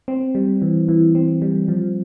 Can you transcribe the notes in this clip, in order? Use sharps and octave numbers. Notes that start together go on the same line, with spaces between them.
C4
G3
E3
E3
C4
G3
F3